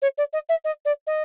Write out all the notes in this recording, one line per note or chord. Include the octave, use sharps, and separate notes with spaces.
C#5
D5
D#5
E5
D#5
D5
D#5